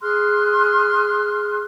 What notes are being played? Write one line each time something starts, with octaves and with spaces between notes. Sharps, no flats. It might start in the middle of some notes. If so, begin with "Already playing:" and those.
G#4 C6 F6 F#6